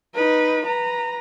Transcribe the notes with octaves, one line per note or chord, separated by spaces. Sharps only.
D#4 B4
B4 A#5